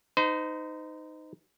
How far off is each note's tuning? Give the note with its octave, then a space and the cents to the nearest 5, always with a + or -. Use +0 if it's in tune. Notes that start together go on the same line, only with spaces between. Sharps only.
D#4 +0 C5 -40